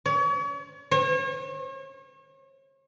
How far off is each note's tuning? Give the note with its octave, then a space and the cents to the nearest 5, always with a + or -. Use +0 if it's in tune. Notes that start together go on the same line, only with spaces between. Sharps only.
C#5 +40
C#5 -40